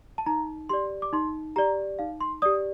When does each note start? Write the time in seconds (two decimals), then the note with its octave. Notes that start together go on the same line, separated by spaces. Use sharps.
0.18 A5
0.26 D#4 A#5
0.69 G4 D5 C6
1.02 D6
1.13 D#4 C6
1.56 G4 D5 A#5
1.99 D#4 F5
2.21 C6
2.42 G4 D5 D#6